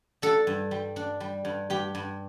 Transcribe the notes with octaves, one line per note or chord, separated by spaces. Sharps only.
D4 A4
G2
G3
D4
G3
G2
G2 G4
G2